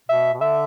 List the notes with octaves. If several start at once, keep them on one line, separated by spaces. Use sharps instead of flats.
B2 E5
B2
D3 E5